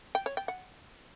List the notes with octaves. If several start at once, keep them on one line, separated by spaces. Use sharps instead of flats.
G5
C#5
G5
F#5